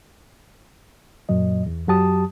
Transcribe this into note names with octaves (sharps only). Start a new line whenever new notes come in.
F#2 A#2 F#3 D#5
E2
F#2 F#3 G4 A5 D#6